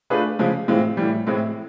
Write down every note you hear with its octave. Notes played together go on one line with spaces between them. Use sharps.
A3 D4 F4 G#4 B4
C#3 F3 G#3
A2 E3 G#3 C4 F4
A2 E3 G3
A2 E3 G#3 C4 E4